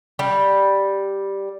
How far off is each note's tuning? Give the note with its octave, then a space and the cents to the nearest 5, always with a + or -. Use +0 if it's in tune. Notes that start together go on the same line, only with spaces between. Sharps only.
G3 +0